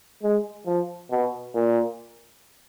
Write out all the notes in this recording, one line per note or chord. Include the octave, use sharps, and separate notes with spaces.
G#3
F3
B2
A#2